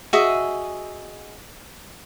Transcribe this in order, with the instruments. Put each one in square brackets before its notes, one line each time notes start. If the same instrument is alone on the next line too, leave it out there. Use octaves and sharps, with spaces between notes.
[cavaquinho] F#4 G#4 D#5 E5